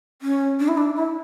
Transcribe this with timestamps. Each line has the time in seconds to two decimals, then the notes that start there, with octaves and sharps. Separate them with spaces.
0.22 C#4
0.60 D4
0.68 E4
0.77 D4
0.96 E4